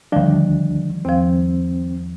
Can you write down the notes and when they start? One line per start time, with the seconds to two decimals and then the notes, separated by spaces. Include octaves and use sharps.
0.12 D2 D#3 F3 G3 D4
1.05 E2 F3 C4